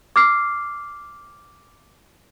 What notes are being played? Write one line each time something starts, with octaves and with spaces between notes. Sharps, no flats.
D6 F6 C7